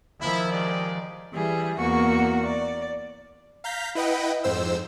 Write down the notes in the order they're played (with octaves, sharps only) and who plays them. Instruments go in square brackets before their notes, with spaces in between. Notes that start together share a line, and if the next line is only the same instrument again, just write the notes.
[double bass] D#3 F3 [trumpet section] E4
[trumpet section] G#3 G4 D5
[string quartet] E3 G3 G#4
E2 A#3 F#4 C#6
D5
[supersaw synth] F5 A#5 G6 B6
E4 B4 D#5 F#5 G5
F2 G#2 C5 E6